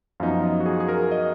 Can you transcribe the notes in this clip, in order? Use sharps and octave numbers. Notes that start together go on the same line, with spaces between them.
F#2 F3 B3 D#4 F5
D#5
F#4
G#4
G#4
A#4
D#5